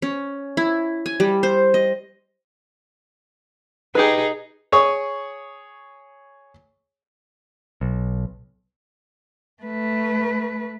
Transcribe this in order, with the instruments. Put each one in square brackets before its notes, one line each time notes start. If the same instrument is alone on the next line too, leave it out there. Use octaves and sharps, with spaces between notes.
[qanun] C#4
E4
G#5
G3
C5
D#5
[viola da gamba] D#4 G#4 [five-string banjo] G4 B4
[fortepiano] G#4 C#5 C#6 D#6
[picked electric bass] B1
[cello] A3 B4